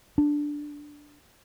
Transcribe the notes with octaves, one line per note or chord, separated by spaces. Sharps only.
D4